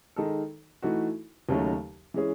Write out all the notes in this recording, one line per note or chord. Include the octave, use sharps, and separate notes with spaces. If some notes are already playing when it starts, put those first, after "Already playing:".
D#3 G#3 D#4 A4
E3 A3 D#4 F#4
D#2 C#3 F#3 A3 D#4
E3 G#3 C#4 G#4